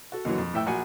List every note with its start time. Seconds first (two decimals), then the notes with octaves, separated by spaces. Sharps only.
0.12 F#4 A4
0.25 D#2 D3 E3 F#3
0.38 F2
0.54 A2 E3 E5 G5 E6
0.66 A#1 F#4 F#5 G#5